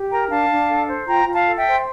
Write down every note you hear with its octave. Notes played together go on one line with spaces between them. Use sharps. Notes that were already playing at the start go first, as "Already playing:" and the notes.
Already playing: G4
A#4 G5 A#5
D4 F5 A5
D4
A4
C5
F4 G5 A#5
F4
F5 A5
A4
E5 G5
C5